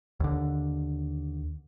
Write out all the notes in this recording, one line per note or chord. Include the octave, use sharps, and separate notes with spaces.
D#2 D3